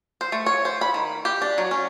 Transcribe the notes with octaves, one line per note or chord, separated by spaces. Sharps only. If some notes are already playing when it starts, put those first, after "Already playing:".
C5
A3
C#5
C5
B5
D#3
G4
D4
F#3
C#4